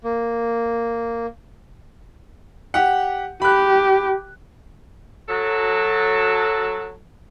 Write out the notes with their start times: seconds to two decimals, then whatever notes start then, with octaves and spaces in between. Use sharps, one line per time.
0.04 A#3
2.74 G4 F#5
3.42 G4 B5 F#6
5.28 F#3 A4